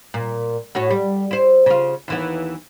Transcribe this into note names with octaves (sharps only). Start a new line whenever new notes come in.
A#2
A2 F#4 C#5
G3
E4 C5
C#3 F4
D#2 E3 B3